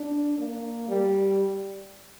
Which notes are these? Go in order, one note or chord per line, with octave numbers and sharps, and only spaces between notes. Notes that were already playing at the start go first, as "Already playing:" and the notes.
Already playing: D4
A#3
G3